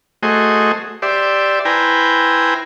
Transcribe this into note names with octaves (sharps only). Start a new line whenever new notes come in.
A3 F#4 G#4 C5 D#5
G4 C5 D5 E5
E4 B4 C5 G5 G#5 A#5